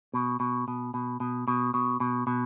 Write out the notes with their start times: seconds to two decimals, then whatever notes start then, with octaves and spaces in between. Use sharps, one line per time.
0.14 B2
0.40 B2
0.68 B2
0.94 B2
1.20 B2
1.48 B2
1.74 B2
2.00 B2
2.27 B2